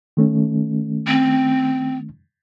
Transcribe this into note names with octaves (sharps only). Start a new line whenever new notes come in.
D#3 A3 C#4
C4